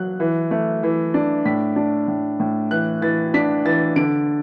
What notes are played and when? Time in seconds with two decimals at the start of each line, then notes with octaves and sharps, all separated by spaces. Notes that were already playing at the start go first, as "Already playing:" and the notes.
Already playing: F#3 F#6
0.20 E3
0.51 A3
0.83 E3
1.14 D4
1.45 A2 B6
1.76 D4
2.08 A2
2.40 A2
2.71 E3 F#6
3.02 E3 A6
3.34 D4 B6
3.65 E3 A6
3.96 D3 D7